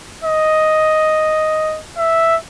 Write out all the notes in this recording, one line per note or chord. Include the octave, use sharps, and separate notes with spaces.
D#5
E5